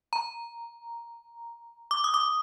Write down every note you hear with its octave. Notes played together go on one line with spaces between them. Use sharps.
A#5
D6
D#6
D6